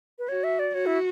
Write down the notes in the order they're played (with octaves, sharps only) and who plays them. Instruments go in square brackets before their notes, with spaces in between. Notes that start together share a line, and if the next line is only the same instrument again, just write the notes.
[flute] B4
[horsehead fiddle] F#4 [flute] C#5
[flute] E5
D5
[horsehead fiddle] F#4 [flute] C#5
[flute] E4